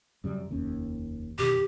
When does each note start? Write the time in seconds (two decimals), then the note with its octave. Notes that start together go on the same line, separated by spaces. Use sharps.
0.24 F#2 C#3 G3
0.49 F1 D#2 C#4
1.39 F#2 B2 D#3 G4